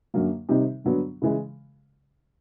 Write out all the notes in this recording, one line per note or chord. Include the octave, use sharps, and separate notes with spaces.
F#2 D3 F#3 A#3
C3 D#3 G3 C4 D#4
G2 D3 F#3 B3 D4
C#3 E3 G#3